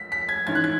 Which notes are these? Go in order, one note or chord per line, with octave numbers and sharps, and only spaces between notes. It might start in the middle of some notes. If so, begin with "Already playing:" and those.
Already playing: B6
B6
G#6
G#2 E3 C#4 G#6
F#6
G#6